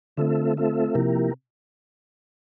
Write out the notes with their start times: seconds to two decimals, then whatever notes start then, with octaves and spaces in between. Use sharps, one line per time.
0.17 D3 A3 C4 F4 A4 E5
0.57 A3 C4 F4 A4 E5
0.95 C3 F3 A#3 E4 G4 A#4